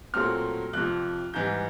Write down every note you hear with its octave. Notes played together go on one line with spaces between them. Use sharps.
A#2 F#3 A3 C4 F6
F2 C3 F3 F#6
G#2 E3 G3 G6